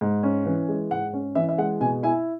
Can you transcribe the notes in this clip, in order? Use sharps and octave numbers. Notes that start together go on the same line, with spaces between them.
G#2
C#4
E3
G#3
G#2 F#5
C#4
E3 E5
E5
G#3 F#5
B2 G#5
E4 G#5